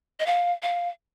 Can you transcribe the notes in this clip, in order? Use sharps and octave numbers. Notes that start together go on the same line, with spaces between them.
D#5
F5
F5